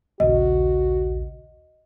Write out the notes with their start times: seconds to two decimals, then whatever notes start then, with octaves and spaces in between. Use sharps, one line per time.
0.20 A#1 D#2 C#3 F#4 D#5